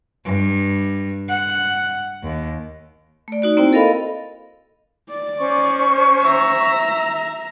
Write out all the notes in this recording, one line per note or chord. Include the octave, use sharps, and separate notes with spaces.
G2
F#5
D#2
A3 D5
D#4 F#4 D5
A#3 C4 E4 C5 G5
A4 A#4 D#5 F5 B5
D5
C#4 C5 C#6
E5 A#5